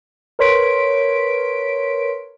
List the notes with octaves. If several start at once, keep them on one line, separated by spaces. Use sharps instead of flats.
A#4 B4 C#5 C6 B6 D7